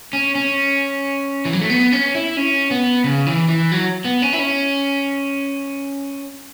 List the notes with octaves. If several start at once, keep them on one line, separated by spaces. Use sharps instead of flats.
C#4
C#4
E3
F#3
A3
B3
C#4
E4
C#4
B3
C#3
E3
E3
F#3
B3
C#4
E4
C#4